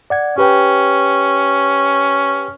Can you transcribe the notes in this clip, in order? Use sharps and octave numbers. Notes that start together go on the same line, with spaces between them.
D5 F#5 G#6
C#4 G4 B4 G5